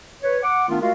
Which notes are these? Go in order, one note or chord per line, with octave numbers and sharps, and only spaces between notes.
B4 C#5
F#5 D6
D#3 A3 B3 D4 F4
G#3 A3 F4 F#4 A#4 F5